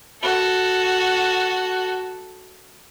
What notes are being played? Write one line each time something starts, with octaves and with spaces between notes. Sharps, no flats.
F#4 A4